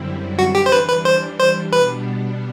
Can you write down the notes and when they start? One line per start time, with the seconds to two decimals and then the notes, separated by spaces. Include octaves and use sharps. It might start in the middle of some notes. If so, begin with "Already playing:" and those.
Already playing: F#2 D3 G3 C4 E4
0.38 E3 G3 D4 F#4
0.55 G4
0.66 C5
0.72 B4
0.88 B4
1.05 C5
1.39 C5
1.72 B2 G3 B3 D4 B4